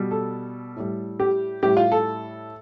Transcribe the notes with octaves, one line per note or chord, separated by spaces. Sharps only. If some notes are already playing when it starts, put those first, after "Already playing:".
Already playing: B2 G3
A4
A2 G3
G4
A2 G3 G4
F4
A4